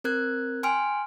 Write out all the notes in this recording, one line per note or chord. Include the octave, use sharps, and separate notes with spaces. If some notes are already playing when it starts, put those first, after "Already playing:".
C4 A#4 F#6 G#6
G5 G#5 C6 F6 D7